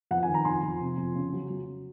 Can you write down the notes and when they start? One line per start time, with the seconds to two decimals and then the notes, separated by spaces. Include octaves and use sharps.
0.11 F2 F#5
0.23 D#3 G#5
0.34 A#5
0.45 F2 G#5 C6
0.63 F2
0.80 C3
0.98 F2
1.16 C#3
1.33 F#3
1.50 F#3